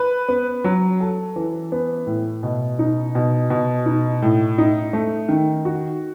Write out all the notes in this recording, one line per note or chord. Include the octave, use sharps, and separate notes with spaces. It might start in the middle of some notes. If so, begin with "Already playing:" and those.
Already playing: B4
B3
F#3
A4
E3
B3
A2
B2
D#4
B2
B2
D#4
A2
D#4
A3
D#3
F#4